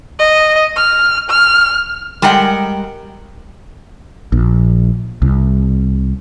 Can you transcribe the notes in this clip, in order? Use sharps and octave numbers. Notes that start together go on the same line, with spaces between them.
D#5
F6
F6
G3 G#3 A#4 F#5 G5
A#1
C2